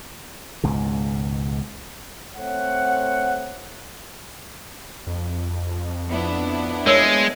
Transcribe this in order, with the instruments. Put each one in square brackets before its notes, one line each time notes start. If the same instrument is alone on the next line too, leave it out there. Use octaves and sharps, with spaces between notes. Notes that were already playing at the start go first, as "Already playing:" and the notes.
[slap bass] C#2 G#2 B2
[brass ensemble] A3 C4 C#5 F#5
[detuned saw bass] F2
[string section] B3 D4 E4
[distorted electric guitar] G#3 [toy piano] A#4 C#5 E6